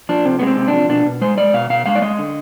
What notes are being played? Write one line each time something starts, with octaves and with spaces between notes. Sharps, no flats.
F3 D4
C3 C4
G#3 B3
C4
C3
D4
F3
B2 D4
B2
G#3 C5
G#3 D5
B2 F5
B2 F5
G#3 F5
D5
G#3 D#5
D3